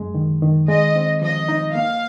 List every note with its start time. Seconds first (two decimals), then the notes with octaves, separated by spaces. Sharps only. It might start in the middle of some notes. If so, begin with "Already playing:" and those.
Already playing: F#2 G#3
0.14 D#3
0.42 D#3
0.68 G#3 D#5
0.96 C4
1.22 F3 D#5
1.49 D#4
1.75 A#3 F5